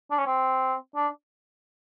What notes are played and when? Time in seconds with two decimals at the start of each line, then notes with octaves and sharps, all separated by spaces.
0.11 D4
0.18 C#4
0.26 C4
0.96 D4